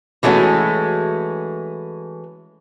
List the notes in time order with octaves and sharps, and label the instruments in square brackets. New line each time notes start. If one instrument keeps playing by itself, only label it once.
[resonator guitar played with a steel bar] E3 G#3 A3 C#4 F#4